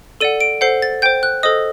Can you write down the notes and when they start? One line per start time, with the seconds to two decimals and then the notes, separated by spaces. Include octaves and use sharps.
0.21 A4 D5 F#5 D#7
0.41 D7
0.61 A4 C5 F#5 C7
0.82 A6
1.02 C5 G5 G6
1.23 F#6
1.43 A4 C5 D#5 D#6